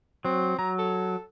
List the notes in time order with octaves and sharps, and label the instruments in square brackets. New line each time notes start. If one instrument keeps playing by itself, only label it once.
[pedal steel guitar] F#3 [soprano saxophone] C4
[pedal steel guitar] F#3 [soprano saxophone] A#5
[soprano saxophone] A4